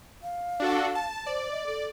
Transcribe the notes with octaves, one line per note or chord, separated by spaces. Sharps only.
F5
D4 F#4 A4
A5
C5 D5
D#5
A4